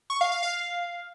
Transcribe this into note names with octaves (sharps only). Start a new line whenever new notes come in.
C#6
F5
F5
F5